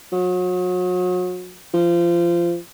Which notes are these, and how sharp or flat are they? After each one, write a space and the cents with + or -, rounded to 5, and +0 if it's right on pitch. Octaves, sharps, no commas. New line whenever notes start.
F#3 -35
F3 -25